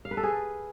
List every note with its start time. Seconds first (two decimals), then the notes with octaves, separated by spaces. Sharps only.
0.05 F5
0.11 B4
0.17 A4
0.23 G#4